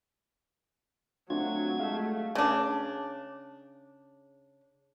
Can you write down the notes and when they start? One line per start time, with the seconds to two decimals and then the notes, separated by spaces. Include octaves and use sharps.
1.30 F#3 A3 C4 D4 F4 F#4 G#6
1.79 G#3 A3 F5
2.35 C#3 D4